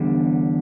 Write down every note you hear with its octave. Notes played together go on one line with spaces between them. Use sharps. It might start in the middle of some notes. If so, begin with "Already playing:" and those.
Already playing: E2 D3 G3